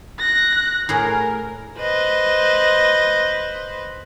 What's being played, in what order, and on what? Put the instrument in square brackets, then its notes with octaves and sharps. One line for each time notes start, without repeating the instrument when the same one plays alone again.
[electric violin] F#6 A#6
[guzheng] A2 G#4 [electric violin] A#4
[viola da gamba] B4 C5 D#5